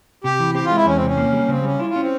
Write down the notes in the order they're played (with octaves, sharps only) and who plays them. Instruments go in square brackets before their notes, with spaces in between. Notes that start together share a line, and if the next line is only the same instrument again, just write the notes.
[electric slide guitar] C3 [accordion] G4
[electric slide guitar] E3
[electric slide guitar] C4 [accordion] G4
[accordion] F4
[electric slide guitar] G#3
[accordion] E4
[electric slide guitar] E2 [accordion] C#4
[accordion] C4
[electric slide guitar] C3 [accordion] C#4
[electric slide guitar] A#3
G3
[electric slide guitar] C#3 [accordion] C4
[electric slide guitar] G3 [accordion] C#4
[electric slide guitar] E4 [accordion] F4
[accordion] F4
[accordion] C4 [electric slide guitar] C#4